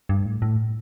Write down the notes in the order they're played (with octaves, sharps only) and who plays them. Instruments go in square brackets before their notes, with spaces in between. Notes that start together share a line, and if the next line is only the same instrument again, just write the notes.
[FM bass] G2
A2
A2